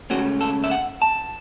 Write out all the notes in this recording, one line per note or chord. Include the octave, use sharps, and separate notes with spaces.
C#2 C#3 A3 C#4 F#4
A4
E5
F#5
A5